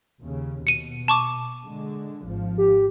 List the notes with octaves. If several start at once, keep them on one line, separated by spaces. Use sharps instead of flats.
D#2 C#3
B2 C#7 D#7
A5 C#6 D6
D3 G#3
G#1 F3
G4